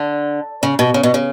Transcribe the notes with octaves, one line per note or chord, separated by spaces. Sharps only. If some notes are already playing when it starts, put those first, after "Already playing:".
Already playing: D3
C#3
B2
C#3
B2
C#3